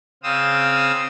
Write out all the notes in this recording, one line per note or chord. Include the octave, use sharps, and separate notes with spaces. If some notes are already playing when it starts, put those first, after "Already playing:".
C#3 C4 F5 D#6 E6